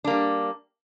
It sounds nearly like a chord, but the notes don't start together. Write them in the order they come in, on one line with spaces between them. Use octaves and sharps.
D4 A#3 G3